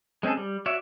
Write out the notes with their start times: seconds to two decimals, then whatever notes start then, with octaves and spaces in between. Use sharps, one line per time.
0.23 G#3 C4 C#4 G#4 A4
0.37 G3
0.66 F#4 C#5 D5 E5